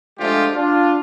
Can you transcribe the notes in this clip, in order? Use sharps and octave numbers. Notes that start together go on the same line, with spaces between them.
F3 G#3 A3 D4 F4 G4
D4 F4